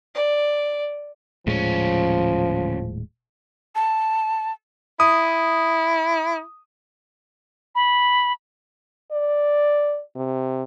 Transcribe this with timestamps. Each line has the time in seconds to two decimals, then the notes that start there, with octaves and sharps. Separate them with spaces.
0.15 D5
1.47 D#1 D2 A2 F3 G#3 C#4
3.75 A5
5.00 E4 D#6
7.75 B5
9.12 D5
10.16 C3